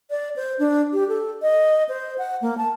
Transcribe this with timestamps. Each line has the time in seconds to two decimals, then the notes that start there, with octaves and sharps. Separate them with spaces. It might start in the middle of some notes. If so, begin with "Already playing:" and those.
0.10 D5
0.36 C5
0.59 D4
0.93 G4
1.09 A4
1.42 D#5
1.89 C5
2.18 F#5
2.42 A#3
2.58 A5